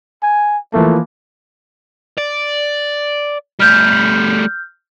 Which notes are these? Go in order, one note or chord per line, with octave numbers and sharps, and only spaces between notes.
G#5
E3 F3 A3 A#3
D5
G3 A3 F6 G6